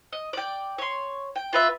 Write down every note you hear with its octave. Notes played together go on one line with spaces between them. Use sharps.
D#5
D5 G5
C#5 C6
G5
F4 B4 E5